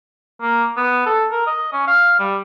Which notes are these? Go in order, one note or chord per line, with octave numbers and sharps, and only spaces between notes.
A#3
B3
A4
A#4
D#5
C#4
F5
G3